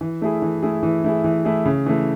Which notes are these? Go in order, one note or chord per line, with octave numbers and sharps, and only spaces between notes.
E3
A3 E4 G#4
E3
A3 E4 G#4
E3
A3 E4 G#4
E3
A3 E4 G#4
C#3
E3 A3